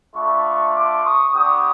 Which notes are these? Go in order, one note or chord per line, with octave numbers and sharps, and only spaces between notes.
A3 D4 F4 B5 C#6
C6 D6
C#6 D#6
B3 D4 G4 C#6 D#6